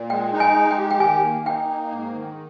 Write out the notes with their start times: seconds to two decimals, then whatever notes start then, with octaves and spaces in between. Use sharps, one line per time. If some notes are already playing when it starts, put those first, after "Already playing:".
Already playing: A#2
0.10 G#3 G5
0.33 D#4
0.40 G#5
0.56 G#3
0.71 G5
0.77 G4
0.91 G5
1.00 D#3 G#5
1.23 A#3
1.46 D#4 G5
1.69 A#3
1.91 G#2
2.15 D#3